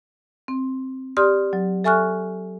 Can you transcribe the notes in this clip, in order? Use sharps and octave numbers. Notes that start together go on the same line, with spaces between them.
C4
G4 D5 C6 D#6 F6
F#3
A4 E5 G#5 C#6 F6 F#6